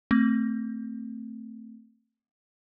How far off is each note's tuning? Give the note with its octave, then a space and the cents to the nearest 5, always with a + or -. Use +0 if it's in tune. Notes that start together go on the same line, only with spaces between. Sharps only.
A3 +20 C4 +0